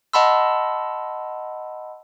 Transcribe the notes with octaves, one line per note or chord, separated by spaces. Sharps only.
D#5 F#5 A5 B5 C6 E6